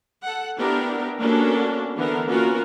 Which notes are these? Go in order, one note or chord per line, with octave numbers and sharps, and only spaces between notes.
A4 F#5
B3 D4 E4 G4 A#4
A#3 B3 C#4 D4 F#4 A4
D3 E3 B3 A#4
A#3 B3 C#4 F4 F#4 A#4